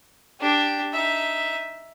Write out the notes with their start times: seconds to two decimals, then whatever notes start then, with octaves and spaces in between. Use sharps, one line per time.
0.40 D4 G4
0.93 D#4 E5